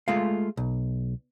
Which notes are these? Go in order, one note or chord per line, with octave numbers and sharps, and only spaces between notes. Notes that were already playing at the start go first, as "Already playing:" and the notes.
G#3 A3 F4 F5
B1